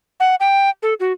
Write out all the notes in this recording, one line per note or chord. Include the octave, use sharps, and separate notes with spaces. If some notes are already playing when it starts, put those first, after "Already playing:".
F#5
G5
A4
F#4